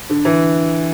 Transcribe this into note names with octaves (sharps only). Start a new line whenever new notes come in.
D3
E3